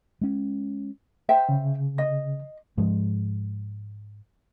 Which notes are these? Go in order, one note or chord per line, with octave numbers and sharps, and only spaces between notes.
G#3 C#4
C5 E5 G5
C#3
D#5
G#2 F3 G#3